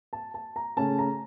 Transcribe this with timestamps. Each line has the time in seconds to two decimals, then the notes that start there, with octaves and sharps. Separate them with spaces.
0.13 A5
0.34 A5
0.56 A#5
0.77 C#3 A3 C#4 A5
0.98 A#5